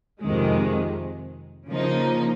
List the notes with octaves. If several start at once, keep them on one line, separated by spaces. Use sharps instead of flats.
F2 C3 D#3 G#3
C#3 F3 A#3 D#4